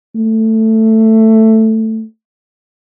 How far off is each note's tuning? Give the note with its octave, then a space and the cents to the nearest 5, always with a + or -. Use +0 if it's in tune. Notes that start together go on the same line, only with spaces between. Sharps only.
A3 +10